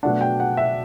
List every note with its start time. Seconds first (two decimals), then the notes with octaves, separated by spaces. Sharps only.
0.03 B2 F#3 A3 D4 F#5
0.21 G5
0.40 F#5
0.57 E5